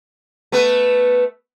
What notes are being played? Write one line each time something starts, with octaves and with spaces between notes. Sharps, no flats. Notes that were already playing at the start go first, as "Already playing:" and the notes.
A3 B3 B4